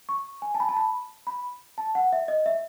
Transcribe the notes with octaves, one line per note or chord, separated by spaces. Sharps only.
C#6
G#5
A5
B5
A5
B5
B5
A5
F#5
E5
D#5
E5